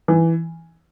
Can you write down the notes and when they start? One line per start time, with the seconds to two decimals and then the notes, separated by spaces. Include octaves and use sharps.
0.08 E3